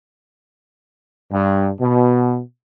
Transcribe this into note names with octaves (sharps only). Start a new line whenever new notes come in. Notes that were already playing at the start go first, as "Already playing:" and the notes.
G2
B2